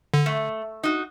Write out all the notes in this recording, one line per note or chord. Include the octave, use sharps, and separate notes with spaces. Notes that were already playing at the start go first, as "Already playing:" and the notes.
D3
A3
D#4 F#4